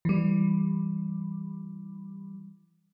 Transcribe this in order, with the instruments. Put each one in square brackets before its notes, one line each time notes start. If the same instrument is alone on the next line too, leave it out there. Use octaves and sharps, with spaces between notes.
[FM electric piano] E3 G3